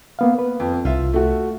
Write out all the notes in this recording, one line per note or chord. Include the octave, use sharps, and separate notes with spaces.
A#3 B3 F5
B4
F2
C2 F4 E5
A3 F#4